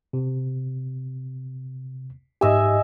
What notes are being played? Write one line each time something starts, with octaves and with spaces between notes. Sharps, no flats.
C3
G#2 G4 D#5 E5 G#5